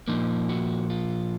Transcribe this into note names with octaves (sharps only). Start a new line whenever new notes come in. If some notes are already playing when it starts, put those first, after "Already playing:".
A#2 F3 A#3 D#4
F#4
F4